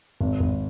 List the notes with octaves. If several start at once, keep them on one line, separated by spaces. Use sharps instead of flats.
G#1
G#1